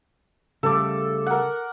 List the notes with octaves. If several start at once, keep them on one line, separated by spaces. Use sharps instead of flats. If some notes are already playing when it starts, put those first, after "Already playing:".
C#3 G3 A3 A4 D6
A#4 F#5